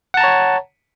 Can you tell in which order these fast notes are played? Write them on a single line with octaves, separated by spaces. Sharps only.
F#5 A5 A#5 C#5